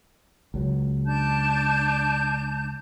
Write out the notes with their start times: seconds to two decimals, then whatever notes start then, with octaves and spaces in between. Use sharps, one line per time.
0.54 C#2 F#3
1.06 D4 A5 G6